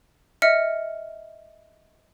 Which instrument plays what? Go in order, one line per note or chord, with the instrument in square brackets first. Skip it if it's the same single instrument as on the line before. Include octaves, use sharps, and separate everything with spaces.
[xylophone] D#5 E5 F6 C#7